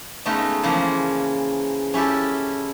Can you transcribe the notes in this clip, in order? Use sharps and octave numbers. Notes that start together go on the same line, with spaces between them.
C#3 G#3 A3 B3 D#4 A#4
C#3 E3 F3 A#3
C#4 E4 G4 A4